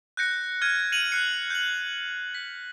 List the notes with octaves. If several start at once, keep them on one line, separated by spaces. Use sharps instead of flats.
F#6 G6 A#6 C#7
F6 G#6 D#7
C#7 D#7 F7 F#7
F#6 C7 C#7
G6 F#7
B6